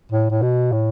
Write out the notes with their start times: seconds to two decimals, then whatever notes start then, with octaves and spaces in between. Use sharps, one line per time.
0.12 A2
0.30 A2
0.42 B2
0.72 A2